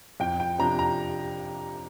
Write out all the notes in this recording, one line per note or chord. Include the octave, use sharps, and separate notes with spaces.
F2 G5
G5
C3 F3 D4 A#5
A#5